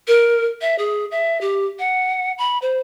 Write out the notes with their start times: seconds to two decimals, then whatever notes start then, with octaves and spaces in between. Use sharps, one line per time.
0.08 A#4
0.61 E5
0.78 G#4
1.11 E5
1.41 G4
1.79 F#5
2.38 B5
2.62 C5